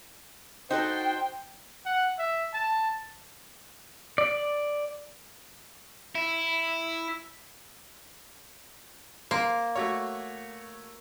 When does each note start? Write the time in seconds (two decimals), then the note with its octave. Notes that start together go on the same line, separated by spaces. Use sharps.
0.71 D#4 F#4 A4 C5 G5
1.85 F#5
2.19 E5
2.54 A5
4.18 D5
6.15 E4
9.31 A#3 C5
9.75 A3 F#4 C#5